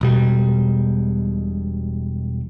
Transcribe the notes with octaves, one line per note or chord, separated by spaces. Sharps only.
E1 B2 G3